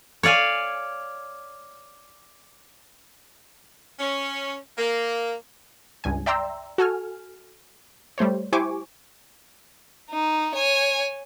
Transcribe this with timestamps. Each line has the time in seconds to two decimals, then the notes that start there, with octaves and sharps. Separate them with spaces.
0.23 C#5 D5 F5 G#5
3.98 C#4
4.77 A#3
6.04 C#2 G2 G#5
6.26 D5 E5 G5 A#5 C6 E6
6.78 F#4 A4 G#5 F6
8.18 G3 A3 C5 C#5
8.53 E4 G4 C5 G#5 C#6 D6
10.11 D#4
10.55 C#5 G#5